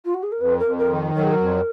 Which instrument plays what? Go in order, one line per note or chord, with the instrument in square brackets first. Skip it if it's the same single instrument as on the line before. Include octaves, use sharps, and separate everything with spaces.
[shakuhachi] F4
F#4
G#4
A#4
[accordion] F2 [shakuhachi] B4
[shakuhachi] A#4
[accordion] F2
[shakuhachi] A#4
[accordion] D#3
[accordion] F#3 [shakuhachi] A#4
[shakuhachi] G#4
A#4
[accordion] F2